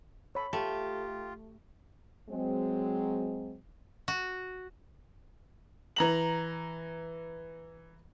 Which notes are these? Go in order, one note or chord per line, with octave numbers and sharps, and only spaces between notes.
A4 C#5 B5
A3 F4 G4
F#3 G#3 C4
F#4
E3 A#5 F#7